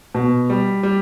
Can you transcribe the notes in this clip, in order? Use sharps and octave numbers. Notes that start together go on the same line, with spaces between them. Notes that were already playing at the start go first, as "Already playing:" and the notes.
B2
G3
G3